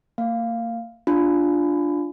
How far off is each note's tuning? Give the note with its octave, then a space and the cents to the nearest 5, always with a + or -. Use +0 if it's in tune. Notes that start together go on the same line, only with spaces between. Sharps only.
A#3 -30 F5 +0
D4 +0 F4 +0